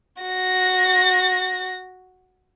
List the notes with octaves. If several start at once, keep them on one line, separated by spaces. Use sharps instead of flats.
F#4 A#6